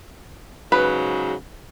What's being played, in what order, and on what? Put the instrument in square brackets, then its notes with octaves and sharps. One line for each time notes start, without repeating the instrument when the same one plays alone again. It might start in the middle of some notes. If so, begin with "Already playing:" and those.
[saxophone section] G#2 C#3 F#3 [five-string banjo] B4